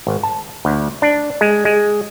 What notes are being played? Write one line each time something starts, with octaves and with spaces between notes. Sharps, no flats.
G#1
A5
D2
D4
G#3
G#3